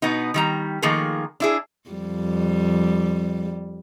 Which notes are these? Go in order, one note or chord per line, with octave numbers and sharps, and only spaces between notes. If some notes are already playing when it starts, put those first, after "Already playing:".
B2 B3 D#4
D#3 G3 A#5
D#3 F3 A3 A#3 G#4
D4 E4 G#4
F2 G3